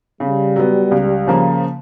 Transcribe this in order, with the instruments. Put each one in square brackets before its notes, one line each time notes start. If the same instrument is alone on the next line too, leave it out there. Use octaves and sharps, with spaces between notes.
[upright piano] C#3 [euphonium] G3
[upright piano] F#3 B3
C#2
C#3 F3 A#3